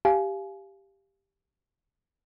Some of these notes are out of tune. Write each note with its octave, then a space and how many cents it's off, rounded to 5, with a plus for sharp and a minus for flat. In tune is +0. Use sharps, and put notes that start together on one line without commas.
G4 +5 F5 -10 G#5 +30